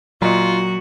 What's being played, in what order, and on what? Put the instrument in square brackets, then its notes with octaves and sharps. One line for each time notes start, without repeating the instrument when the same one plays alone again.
[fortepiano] A#2 D#5 [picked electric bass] F#3 [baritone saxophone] F4 [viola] F#4